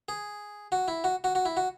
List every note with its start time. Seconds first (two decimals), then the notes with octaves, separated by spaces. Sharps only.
0.09 G#4
0.72 F#4
0.88 E4
1.04 F#4
1.24 F#4
1.35 F#4
1.45 E4
1.57 F#4